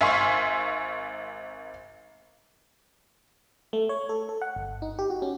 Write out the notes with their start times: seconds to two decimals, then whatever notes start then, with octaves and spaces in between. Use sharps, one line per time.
0.01 G#1 E5 F5 G#5 C6 C#6
3.73 A3
3.89 C#5
4.09 A4
4.29 A4
4.42 F#5
4.56 G1
4.82 D#4
4.99 G4
5.10 F#4
5.22 C#4